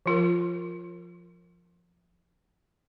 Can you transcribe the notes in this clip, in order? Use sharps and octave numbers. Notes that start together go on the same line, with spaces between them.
F3 F4 A#4